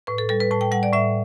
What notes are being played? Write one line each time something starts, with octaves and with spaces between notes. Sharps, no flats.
A2 B4
A4
G3 A4
B4
A2 A5
G5
G3 F#5
D5
A2 E5